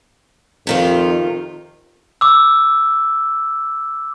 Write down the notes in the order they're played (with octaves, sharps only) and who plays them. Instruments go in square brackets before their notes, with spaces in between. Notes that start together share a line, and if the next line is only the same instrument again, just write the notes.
[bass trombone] F2 [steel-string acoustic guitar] C3 D#3 F4
[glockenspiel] D6 E6